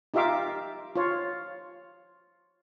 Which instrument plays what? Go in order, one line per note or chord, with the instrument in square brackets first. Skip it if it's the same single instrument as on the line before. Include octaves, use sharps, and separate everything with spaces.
[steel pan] D#4 F4 G4 E5 F5 D6
F4 C#5